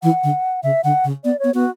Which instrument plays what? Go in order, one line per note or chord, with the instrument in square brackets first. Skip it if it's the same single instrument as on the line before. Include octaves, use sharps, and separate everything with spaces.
[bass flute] E3 [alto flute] F#5
[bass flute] D3
[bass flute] C#3 [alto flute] E5
[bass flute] D3 [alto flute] F#5
[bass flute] C#3
[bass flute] B3 [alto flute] D5
[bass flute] B3 [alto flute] C#5
[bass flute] B3 [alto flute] F#4